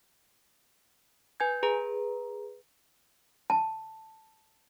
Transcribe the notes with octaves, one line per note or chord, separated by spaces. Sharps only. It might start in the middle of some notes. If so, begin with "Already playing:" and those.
B4 G#5 G6 G#6
G#4 B4 A#5
A5